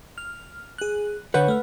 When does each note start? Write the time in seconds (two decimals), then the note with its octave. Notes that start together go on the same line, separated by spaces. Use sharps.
0.18 F6
0.78 G#4 F#6
1.34 D3 B4 C#5 F#5 G6
1.48 A3 F6